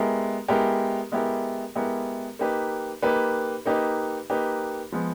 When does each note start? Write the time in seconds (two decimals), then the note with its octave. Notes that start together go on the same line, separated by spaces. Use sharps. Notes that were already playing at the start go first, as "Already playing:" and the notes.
Already playing: G#3 B3 E4 G4 A#4
0.48 G#3 B3 E4 G4 A#4
1.12 G#3 B3 E4 G4 A#4
1.75 G#3 B3 E4 G4 A#4
2.39 A#3 D#4 G4 B4
3.02 A#3 D#4 G4 B4
3.66 A#3 D#4 G4 B4
4.30 A#3 D#4 G4 B4
4.92 F3 G#3 B3